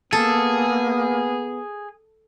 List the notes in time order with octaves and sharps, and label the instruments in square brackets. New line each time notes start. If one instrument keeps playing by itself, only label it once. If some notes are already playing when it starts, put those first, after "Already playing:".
[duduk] A#3 [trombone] B3 [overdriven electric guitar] G#4 [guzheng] A4